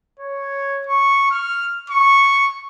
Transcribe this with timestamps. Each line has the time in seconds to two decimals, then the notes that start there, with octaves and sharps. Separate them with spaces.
0.19 C#5
0.87 C#6
1.31 F6
1.90 C#6